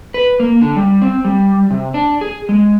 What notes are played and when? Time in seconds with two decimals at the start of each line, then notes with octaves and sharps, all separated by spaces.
0.14 B4
0.40 A#3
0.62 D3
0.76 G3
1.02 C4
1.25 G3
1.70 C3
1.94 D4
2.21 G#4
2.49 G#3